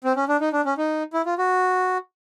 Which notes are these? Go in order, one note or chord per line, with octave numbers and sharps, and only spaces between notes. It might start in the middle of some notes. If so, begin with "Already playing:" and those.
C4
C#4
D4
D#4
D4
C#4
D#4
E4
F4
F#4